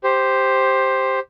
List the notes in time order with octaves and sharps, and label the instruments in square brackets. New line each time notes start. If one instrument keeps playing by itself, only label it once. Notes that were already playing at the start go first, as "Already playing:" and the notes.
[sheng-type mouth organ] G4 C5